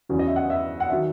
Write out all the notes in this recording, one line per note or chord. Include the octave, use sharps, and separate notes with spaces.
E2 C#3 F#3
D#5
E5
F#5
E5
F#5
D#3 F#3 E5